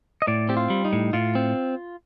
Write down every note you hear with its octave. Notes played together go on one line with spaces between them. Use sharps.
D#5
A2 D5
C4 G4
F4
G3
D#4
A2
A2 F4
C4